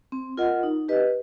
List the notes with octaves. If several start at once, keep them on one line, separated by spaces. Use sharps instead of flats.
C4
F4 A#4 D#5 F#5
D#4
G4 B4 D#5